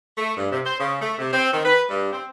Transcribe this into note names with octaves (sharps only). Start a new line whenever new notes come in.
A3
G2
C3
C5
C#3
A3
C3
C4
D#3
B4
G2
C4